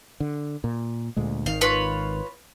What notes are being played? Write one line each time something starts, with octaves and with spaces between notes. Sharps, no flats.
D3
A#2
D2 A#2 G#3
G#1 D#3 F5
F4 B4 C#5